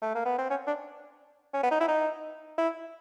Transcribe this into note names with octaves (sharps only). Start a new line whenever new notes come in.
A3
A#3
B3
C4
C#4
D4
C#4
B3
D#4
E4
D#4
E4